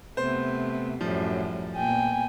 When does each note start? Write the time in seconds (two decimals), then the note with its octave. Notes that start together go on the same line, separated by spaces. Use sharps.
0.17 C3 A3 B3 C5
1.01 F#2 A2 F3 G3
1.76 A#2 B3 G5 G#5